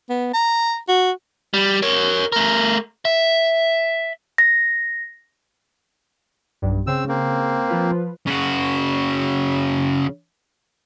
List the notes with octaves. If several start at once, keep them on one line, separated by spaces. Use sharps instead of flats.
B3
A#5
F#4
G3
A#4 C#5
A3 A#4
E5
A#6
B1 G2
C#3 C4 E6
A#3 C4
F3 F4 B4
C#3 F#4